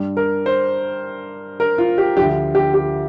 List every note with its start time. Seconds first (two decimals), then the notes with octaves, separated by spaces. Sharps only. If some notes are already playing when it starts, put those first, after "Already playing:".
Already playing: G2 G3
0.17 A#4
0.46 C5
1.60 A#4
1.78 F4
1.98 G4
2.17 D2 D3 F3 G4
2.55 G4
2.74 G4